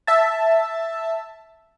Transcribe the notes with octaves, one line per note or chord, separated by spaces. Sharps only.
E5 A5